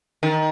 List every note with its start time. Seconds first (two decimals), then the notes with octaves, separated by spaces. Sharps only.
0.23 D#3